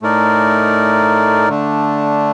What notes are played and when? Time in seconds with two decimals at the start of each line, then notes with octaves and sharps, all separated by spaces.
0.02 A2 A3 D#4 A#4 D5
1.50 D3 A3 D4